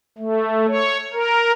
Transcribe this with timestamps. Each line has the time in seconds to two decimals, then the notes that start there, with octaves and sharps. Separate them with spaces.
0.18 A3
0.68 C#5
1.13 A#4